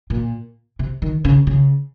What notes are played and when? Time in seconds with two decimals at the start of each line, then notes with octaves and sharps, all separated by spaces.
0.10 A#2
0.79 C3
1.02 D#3
1.25 C#3
1.47 C#3